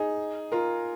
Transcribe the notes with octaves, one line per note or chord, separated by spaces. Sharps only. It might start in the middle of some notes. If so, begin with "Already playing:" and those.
Already playing: D#4 G#4
F4 A#4